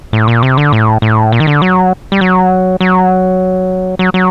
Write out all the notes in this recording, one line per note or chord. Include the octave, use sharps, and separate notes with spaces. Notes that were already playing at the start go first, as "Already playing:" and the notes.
A2
A#2
C3
D3
A2
A2
A#2
D#3
D3
F#3
G3
F#3
F#3
F#3
F#3